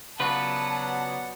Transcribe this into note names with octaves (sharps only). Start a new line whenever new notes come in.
C#3 F#3 B3 F4 B4 D5 F#5 A5